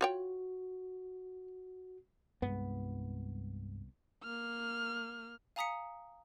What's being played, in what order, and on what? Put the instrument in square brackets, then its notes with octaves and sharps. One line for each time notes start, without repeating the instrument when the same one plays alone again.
[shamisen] F4 C#5 G5 [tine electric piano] F#4
[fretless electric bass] C2 B3 [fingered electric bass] G2 G#3
[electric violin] A#3 F6
[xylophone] F5 G#5 A#5 D#6 B6 C#7